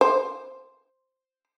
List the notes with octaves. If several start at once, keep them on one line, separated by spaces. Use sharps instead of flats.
C5